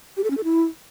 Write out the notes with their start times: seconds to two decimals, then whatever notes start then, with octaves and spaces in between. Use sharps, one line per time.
0.17 G4
0.24 A4
0.30 C#4
0.37 A4
0.44 E4